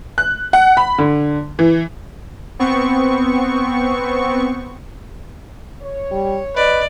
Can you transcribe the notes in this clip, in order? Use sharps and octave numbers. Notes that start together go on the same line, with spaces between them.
F#6
F#5
B5
D3
E3
B3 C4 C#6
C#5
G3
B4 D5 D#5